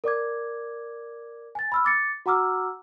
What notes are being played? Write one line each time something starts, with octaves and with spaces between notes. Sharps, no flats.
A#4 D5 D6 G#6
G#5 A6
B5 E6 F6
D6 A6 C#7
F#4 F#5 A#5 D6 E6 F6